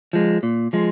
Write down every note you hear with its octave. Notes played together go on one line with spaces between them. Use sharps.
F3 G#3
A#2
F3 G#3